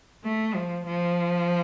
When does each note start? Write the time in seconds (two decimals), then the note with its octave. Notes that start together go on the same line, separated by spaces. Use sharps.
0.24 A3
0.55 F3
0.87 F3